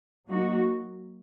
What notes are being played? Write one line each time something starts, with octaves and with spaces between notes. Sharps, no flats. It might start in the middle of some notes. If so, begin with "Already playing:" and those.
F#3 A#3 D#4 F#4